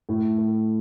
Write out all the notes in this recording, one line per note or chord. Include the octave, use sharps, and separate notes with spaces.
A2
A2